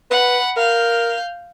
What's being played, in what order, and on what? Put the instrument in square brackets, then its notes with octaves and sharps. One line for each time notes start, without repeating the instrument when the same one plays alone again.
[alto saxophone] B4 [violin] F#5 B5
[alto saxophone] A#4 [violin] F5 G6